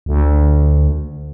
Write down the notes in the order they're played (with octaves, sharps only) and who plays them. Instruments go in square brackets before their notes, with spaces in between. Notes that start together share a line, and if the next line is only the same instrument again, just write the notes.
[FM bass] D2